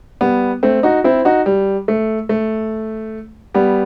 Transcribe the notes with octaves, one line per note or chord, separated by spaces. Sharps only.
G3 B3
A3 C4
D#4 F#4
C4 E4
D#4 F#4
G3
A3
A3
G3 B3